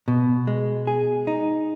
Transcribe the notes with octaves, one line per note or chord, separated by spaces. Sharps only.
B2
G#3
G#4
D#4